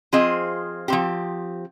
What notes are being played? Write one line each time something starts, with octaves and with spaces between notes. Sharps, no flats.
F3 C4 F4 G#4 D#5
F3 C4 G4